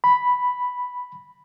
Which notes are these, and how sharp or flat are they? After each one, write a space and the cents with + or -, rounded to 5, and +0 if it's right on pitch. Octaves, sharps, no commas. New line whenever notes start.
B5 +0